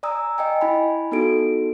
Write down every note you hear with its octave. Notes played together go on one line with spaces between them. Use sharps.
D5 G#5 A#5 D#6 E6
D#5 G5 G#5
E4 G#5 B5
B3 D#4 F#4 A4 D7